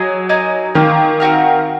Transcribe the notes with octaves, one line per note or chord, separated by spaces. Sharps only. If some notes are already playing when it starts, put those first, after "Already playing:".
Already playing: F#3 G#4 D#5 G#5
D#4 A#4 D#5 G#5
D#3 A#3 F4 A#4
C4 F#4 A#4 F5